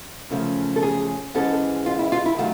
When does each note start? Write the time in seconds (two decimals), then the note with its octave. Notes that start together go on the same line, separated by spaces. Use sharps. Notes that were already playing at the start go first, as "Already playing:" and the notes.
0.31 F#2 C#3 F3 A3 C#4
0.76 A4
0.83 G#4
1.34 G#2 E3 G#3 C#4 A4
1.86 F4
1.99 E4
2.12 F4
2.26 E4
2.38 D#3 F#3 A3 F4